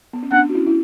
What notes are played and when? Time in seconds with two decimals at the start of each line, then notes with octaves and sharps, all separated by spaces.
0.13 B3
0.23 C#4
0.31 B3 D4 F#5
0.49 F#4
0.54 C#4 E4
0.67 E4